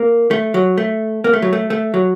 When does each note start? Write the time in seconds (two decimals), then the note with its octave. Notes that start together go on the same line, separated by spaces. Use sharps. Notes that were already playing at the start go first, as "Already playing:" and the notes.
Already playing: A#3
0.31 A3
0.54 F#3
0.78 A3
1.24 A#3
1.33 A3
1.42 F#3
1.53 A3
1.70 A3
1.94 F#3